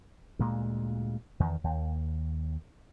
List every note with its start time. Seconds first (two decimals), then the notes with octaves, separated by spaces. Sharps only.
0.39 D2 A#2 G#3
1.40 E2 D#3
1.64 D#2